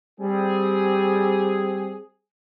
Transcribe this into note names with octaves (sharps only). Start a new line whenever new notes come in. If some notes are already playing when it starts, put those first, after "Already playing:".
G3 C4 G4 G#4